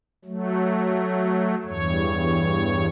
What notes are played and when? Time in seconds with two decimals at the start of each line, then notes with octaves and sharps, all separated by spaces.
0.25 F#3 A3
1.66 E2 G2 C#5